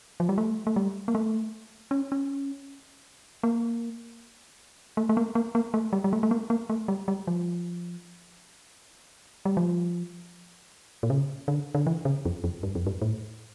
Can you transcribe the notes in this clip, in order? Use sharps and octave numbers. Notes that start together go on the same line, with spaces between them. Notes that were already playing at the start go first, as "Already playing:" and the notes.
F3
G3
A3
A3
G3
A#3
A3
C#4
C#4
A#3
A3
A3
A#3
A#3
A#3
A3
G3
G3
A3
A3
A#3
A#3
A3
G3
G3
F3
G3
F3
A#2
C#3
D3
D3
E3
C#3
F2
F2
G2
F2
G2
A2